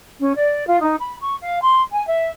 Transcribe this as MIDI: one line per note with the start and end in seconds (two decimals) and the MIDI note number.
0.20 0.32 61
0.36 0.66 74
0.67 0.78 65
0.81 0.95 63
1.00 1.16 83
1.22 1.36 85
1.41 1.60 77
1.61 1.81 84
1.92 2.07 80
2.07 2.31 76